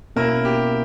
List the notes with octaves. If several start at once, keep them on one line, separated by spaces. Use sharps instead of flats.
B2 A#3 C#4 E4 A#4
G4